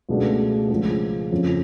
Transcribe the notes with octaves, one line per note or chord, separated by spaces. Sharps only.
C#2 B2 A3 D4 G#4
C#2 C#3 F3
F2 C#3 F3